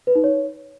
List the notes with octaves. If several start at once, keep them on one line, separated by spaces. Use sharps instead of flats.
B4
D#4
C#5